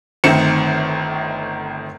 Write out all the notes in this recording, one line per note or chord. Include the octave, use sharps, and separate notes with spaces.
G1 D#3 A3 C4 C#7 E7